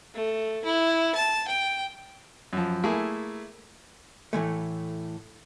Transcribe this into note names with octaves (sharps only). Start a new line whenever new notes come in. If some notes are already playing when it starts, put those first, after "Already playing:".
A3
E4
A5
G5
F#2 F3
A3 A#3 E4 G#4
A2 E3 G#3 A3